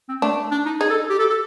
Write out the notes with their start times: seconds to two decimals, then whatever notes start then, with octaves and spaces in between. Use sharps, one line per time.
0.09 C4
0.22 A3 D4
0.51 D4
0.66 D#4
0.81 D#4 G#4
0.90 A4
1.10 G4
1.19 A4
1.30 A4